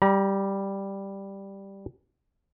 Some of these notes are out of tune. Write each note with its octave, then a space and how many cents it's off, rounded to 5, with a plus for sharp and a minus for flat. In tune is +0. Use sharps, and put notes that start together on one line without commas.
G3 +0 A#5 +45